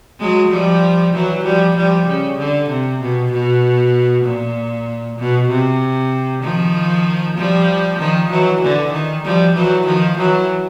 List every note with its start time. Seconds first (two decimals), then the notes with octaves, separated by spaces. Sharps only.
0.20 F#3 G#3
0.51 F3 G3
1.13 E3 F#3
1.44 F3 G3
1.76 F3 G3
2.07 C#3
2.38 D3
2.69 C3
3.01 B2
3.32 B2
4.25 A#2
5.18 B2
5.50 C3
6.43 D#3 F3
7.37 F3 G3
7.99 D#3 F3
8.31 E3 F#3
8.61 D3 E3
8.92 D#3
9.24 F3 G3
9.54 E3 F#3
9.86 D#3 F3
10.17 E3 F#3